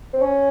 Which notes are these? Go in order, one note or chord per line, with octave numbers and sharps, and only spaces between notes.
C4
C#4